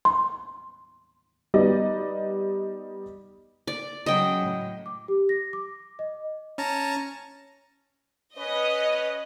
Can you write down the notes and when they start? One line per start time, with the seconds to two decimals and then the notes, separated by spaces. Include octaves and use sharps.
0.05 C6
1.54 G3 B3 D#4 D5 D#5
3.67 D5
4.06 C#3 F#3 D#5 G5
4.44 A2
4.86 D6
5.08 G4
5.29 A#6
5.53 D6
5.99 D#5
6.58 C#4 A5 A#5
8.38 C#4 B4 D#5